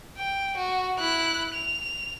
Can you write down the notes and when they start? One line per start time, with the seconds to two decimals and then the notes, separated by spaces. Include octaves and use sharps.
0.18 G5
0.57 F#4
0.98 E4 F#6
1.54 F7